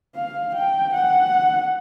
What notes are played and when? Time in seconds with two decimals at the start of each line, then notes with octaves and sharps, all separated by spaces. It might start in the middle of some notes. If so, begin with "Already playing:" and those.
0.15 F5
0.55 G5
0.94 F#5